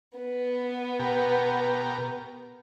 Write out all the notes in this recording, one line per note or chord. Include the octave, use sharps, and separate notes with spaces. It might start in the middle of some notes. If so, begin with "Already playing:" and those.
B3
B2 G4 A#4